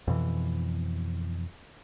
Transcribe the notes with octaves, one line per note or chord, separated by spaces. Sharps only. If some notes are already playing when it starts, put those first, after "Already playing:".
F2 B2 E3